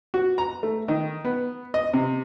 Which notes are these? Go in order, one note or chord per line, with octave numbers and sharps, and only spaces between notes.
F#4
A#5
A3
D#3
B3
D#5
C3